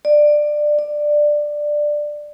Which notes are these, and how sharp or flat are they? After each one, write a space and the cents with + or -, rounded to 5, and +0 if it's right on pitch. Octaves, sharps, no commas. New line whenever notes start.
D5 +15
D5 +10